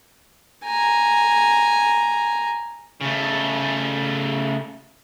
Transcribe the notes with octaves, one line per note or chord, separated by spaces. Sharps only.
G#5 A#5
C#3 A3